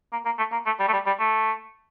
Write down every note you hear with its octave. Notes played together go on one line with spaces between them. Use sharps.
A#3
A#3
A3
A#3
A3
G3
A3
G3
G3
A3